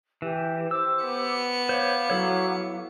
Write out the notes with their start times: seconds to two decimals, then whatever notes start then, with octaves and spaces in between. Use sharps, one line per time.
0.22 E3 G4
0.71 G4 C5 D6 E6
1.05 B3 C#7
1.69 C5 C#5 F5 D6
2.10 F#3 E4 A4 C#5